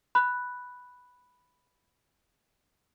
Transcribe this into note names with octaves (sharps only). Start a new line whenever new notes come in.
B5 F#6